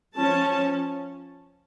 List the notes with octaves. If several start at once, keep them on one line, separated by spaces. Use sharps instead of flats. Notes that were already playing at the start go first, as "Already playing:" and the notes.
F3 C#4 A5